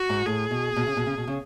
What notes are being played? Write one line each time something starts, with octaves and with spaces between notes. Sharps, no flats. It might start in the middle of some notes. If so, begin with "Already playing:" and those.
Already playing: F#4
G#2
A2 G#4
B2
B2
C#3
B2
C#3
B2
C#3